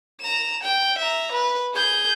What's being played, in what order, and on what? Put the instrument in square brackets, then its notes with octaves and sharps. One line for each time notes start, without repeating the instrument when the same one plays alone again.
[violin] A#5 E7
G5
E5 A#5
B4
G#4 G6